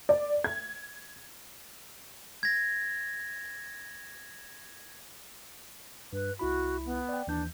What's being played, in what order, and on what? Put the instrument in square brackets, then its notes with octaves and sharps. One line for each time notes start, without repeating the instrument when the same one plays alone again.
[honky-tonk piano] D5
G#6
[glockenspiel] G#6 A#6
[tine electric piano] G2 [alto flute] B4
[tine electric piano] C2 E4 B5 [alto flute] F#4
[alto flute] B3
[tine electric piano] D5 G5
[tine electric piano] D#2 E3 G6 [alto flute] D4